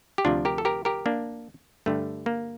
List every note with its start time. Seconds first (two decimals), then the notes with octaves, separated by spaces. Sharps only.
0.18 G4
0.25 D2 C3 F3 D4 F4
0.45 G4 A#4
0.58 A4
0.65 G4 A#4
0.85 G4 A#4
1.06 A#3 D4
1.86 G2 D3 G3 A3
2.26 A#3